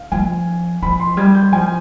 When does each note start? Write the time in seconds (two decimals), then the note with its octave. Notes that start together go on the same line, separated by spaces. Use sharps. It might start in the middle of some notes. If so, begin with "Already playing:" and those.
Already playing: F5
0.12 F3 G#5
0.82 F3 B5
1.00 C6
1.17 G3 G#6
1.35 G6
1.52 F3 G#5